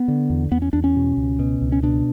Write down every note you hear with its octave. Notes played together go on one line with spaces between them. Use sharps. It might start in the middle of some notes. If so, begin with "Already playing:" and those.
Already playing: B3
D3
E2
E2 B3
C#4
E2 D4
C#4
B2
C#2
B2
C#2
C#4
B2 D4